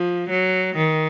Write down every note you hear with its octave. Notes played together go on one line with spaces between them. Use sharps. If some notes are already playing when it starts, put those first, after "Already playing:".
Already playing: F3
F#3
D#3